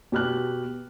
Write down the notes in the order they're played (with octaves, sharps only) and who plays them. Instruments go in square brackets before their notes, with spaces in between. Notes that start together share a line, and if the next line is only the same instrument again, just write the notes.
[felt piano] B2 G4 F6 F#6